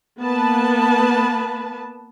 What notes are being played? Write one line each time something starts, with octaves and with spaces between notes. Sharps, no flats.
A#3 B3 B4 A5